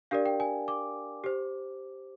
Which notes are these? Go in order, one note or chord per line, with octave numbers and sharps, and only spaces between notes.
D4 G4 A#4 D5 F5
G5
G#5
D6
G4 C5